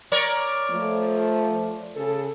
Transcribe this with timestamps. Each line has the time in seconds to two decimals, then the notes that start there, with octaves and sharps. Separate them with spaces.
0.12 A#4 C#5 D5
0.70 F3 A3
1.95 C#3 G#4 A4